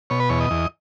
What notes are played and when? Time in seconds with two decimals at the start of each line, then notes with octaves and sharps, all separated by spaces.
0.10 B2 C#5
0.20 B4
0.29 E2 C#5
0.41 D#5
0.50 E2